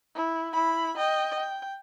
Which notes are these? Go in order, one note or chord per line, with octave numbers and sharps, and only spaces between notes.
E4
E4 B5
D#5 G5
G5